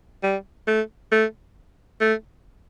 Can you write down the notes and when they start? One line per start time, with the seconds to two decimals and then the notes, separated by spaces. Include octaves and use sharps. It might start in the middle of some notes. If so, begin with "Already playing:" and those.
0.23 G3
0.68 A3
1.12 A3
2.00 A3